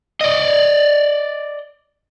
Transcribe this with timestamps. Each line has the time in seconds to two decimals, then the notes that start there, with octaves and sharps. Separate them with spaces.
0.21 D5 D#5